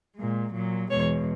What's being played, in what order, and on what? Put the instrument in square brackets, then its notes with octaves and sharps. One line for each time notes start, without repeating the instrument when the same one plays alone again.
[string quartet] A#2 G#3
A#2 F#3
E2 B2 G#3 C#5